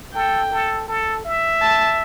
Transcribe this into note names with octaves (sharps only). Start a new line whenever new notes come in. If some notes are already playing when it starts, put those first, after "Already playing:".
A4 G5
A4
A4
E5
A5